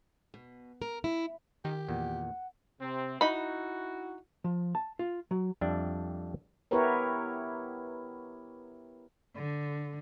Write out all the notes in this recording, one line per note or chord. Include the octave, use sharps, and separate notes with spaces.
B2
A#4
E4
D#3 G4
E2 A#2 F#5
C3 C4
D#4 E4 F#4 B5
F3
A5
F4
F#3
F2 G3 D4 E5
B3 E4 G4 A#4 B4 C#5
D3